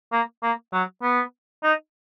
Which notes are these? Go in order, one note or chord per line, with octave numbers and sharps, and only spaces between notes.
A#3
A#3
F#3
B3
D#4